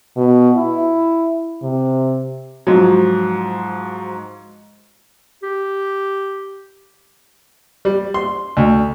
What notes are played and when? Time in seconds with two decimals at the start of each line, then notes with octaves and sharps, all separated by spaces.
0.17 B2
0.56 E4
1.63 C3
2.67 G#2 F3 F#3
5.43 G4
7.85 G3
8.14 C6
8.57 D2